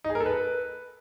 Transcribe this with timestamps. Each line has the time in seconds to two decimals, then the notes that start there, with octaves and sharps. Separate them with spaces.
0.04 D#4
0.10 G#4
0.15 A#4
0.20 A4
0.26 B4